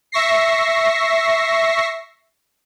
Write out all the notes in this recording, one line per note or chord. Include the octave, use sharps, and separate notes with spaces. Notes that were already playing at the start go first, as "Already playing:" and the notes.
E5 C#6 A#6 C7